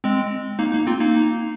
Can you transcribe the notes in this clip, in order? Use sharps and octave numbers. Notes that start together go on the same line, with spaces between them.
G#3 C4
A#3 D#4
A#3 D#4
C4 F4
A#3 D#4